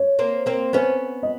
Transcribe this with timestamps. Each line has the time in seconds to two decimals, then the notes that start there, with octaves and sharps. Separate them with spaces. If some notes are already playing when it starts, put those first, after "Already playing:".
Already playing: C#5
0.19 A#3 C4
0.46 A#3 C4
0.73 B3 C#4 C5
1.23 D#5